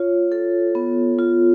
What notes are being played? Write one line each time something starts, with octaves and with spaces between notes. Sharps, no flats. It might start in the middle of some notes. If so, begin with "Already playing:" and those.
Already playing: F4 C#5
A4
B3
F4